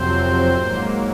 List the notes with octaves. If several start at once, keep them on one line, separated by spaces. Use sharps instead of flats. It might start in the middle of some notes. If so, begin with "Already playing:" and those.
Already playing: F2 C3 F#3 C4 C5
G#2 F#3 A#3